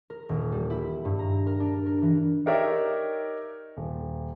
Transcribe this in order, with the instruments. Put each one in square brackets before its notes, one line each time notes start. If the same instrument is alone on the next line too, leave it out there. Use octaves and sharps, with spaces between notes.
[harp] A#4
D#1
G3
E4
G2
A#5
A#4
D4
A#4
E3
[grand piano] D#4 G4 A#4 C#5 D5 E5
D#1